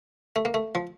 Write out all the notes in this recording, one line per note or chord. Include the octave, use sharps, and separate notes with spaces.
A3
A#3
A3
F3